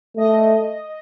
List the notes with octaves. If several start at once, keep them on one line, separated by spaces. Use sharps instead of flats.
A3 D#5